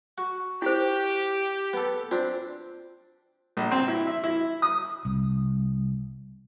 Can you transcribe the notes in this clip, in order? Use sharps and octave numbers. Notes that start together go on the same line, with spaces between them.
F#4
E4 G4 C5
B3 A4
C4 D4 F4
A#1
C4
E4
E5
E4
D#6
C2